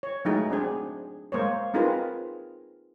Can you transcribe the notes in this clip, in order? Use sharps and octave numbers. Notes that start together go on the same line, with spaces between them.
C#5
F#3 G#3 A3 D#4 G#4
C4 D4 G#4
G#3 A#3 C5 C#5
C4 D#4 F4 G#4 A#4 B4